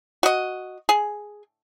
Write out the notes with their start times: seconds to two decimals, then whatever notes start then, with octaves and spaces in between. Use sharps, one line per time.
0.23 F#4 D#5
0.89 G#4